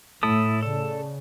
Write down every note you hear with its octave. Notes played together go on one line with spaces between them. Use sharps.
A2 A3 E4 A4 D#6
C#3 A4 D5 A5